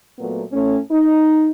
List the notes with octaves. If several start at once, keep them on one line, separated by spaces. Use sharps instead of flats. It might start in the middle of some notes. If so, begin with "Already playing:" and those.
A#2 F#3 A3 B3
A2 A3 C#4
D#4